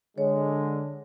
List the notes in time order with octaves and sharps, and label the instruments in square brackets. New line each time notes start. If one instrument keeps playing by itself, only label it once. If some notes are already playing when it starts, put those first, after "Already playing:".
[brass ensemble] D3 [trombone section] G#3 [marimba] C#5